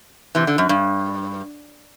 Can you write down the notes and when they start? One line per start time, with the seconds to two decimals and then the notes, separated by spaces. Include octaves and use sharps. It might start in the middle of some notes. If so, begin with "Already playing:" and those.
0.35 C3 E3
0.47 D3
0.58 F#2
0.69 G2